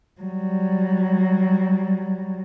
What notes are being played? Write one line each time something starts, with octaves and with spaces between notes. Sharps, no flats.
F#3 G3